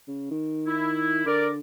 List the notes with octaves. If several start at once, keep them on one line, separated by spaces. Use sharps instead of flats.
C#3
D#3
E4
D3 A#4 D5